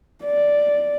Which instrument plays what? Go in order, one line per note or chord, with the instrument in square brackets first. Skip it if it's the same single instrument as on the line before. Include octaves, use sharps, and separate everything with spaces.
[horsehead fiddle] D5